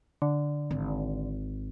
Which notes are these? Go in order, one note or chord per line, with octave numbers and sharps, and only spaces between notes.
D3
G#1